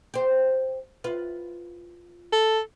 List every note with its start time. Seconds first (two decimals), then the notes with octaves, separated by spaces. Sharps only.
0.14 G4 C5
1.04 F4 B4
2.32 A4